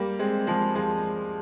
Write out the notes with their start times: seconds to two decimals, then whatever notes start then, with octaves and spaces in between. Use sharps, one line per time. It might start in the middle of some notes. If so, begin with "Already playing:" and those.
Already playing: G3 A#3
0.19 G#3 C4
0.47 F3 G#3
0.75 F3 G#3